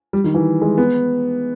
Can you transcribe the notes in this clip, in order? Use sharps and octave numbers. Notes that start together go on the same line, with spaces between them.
G3
D#3
E3
G#3
B3